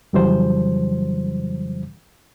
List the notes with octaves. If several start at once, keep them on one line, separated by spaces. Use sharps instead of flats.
F2 C#3 E3 F#3 G3 C5